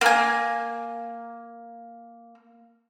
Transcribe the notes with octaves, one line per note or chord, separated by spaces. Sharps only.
A#3 G#5